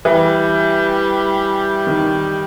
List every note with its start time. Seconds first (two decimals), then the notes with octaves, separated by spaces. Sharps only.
0.04 E3 G3
1.87 D#3